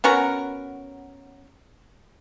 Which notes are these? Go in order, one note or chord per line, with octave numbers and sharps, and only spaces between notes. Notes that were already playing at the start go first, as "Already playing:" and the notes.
B3 C#4 F#4 A#4